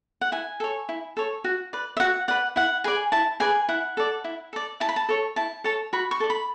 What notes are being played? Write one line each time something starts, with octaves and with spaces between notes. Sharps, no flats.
F#5
E4 G#5
A4 C#5
E4
A4 C#5
F#4
B4 D5
E5
F#4 F#5
B4 D5 F#5
E4 F#5
G#4 B4 D5 G#5
E4 A5
G#4 B4 D5 G#5
E4 F#5
A4 D5
E4
A4 D5
E4 A5
B5
A5
A4 C#5
E4 A5
A4 C#5 A5
F#4 B5
C#6
A4 D5
B5